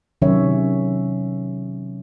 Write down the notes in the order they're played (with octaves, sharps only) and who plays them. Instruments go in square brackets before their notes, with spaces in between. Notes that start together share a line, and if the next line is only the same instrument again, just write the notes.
[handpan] C3 D#3 F#3 C#4 C#5 E5